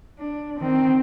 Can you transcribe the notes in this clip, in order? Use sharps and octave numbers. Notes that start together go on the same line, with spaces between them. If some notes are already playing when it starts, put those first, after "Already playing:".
D4
D#3 C4